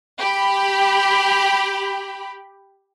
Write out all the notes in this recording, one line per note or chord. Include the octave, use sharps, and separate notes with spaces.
G4 B5